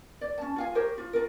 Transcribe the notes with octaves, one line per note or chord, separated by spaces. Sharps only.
D5
C#4 A5
F4 F5 G#5
G4 A#4 C5 C#5
F4
F4 A#4